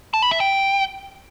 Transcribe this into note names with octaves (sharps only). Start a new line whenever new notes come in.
A5
B5
E5
G5